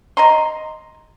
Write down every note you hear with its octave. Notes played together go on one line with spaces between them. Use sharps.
D#5 A#5 C6